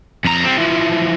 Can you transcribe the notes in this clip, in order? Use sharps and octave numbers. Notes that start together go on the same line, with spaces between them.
F2 A#5
G3 C4
E3 F3